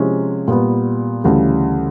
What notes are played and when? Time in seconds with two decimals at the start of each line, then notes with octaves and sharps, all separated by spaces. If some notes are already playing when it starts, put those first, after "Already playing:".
Already playing: C3 F3 G#3 C#4 E4
0.48 A#2 G3 B3
1.24 D2 C#3 E3 G3